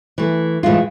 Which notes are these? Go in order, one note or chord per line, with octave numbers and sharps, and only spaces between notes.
E3 A3
A2 E3 G#3 F4